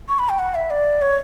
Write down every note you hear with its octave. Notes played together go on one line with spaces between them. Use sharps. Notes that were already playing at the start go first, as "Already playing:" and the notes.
C#6
B5
G5
F#5
E5
D5
C#5